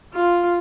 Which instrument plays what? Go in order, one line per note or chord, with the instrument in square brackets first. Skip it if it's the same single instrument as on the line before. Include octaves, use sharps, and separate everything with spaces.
[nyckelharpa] F4